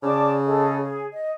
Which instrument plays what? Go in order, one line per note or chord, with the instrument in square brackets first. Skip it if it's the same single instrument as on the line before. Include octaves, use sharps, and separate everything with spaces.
[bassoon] C#3 [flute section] D5 A5 D6
[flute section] G#4 A4 D#5
G#4
D#5